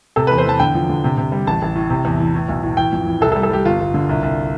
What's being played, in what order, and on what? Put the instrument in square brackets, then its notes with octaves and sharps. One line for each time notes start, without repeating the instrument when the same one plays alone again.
[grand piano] C3 A4
E2 B4
C5
E2 A5
D3 G5
F3
D3
C3
C3
G3
A1 A5
A1
A2
C3
E2
E3
A2
B1
A2
E3 G5
F2
E3
C2 A4
A4
G3
A4
G3 G4
G1 F4
G1
D3
C2
C2